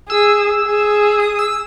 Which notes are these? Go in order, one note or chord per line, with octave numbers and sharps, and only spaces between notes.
G#4 E6
G#4
D#6
E6